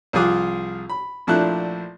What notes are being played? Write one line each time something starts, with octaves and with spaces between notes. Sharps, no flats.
C2 F3 F4 G#4 D6 F#6
B5
A#1 F3 A3 D4 E4 F#6